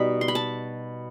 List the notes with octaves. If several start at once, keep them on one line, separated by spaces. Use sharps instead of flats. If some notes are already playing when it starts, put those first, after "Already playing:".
Already playing: B2 G3 D#4 B5
C6
B5
A5